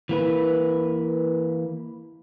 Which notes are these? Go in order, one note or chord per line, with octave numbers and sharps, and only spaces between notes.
E3 A#3 B4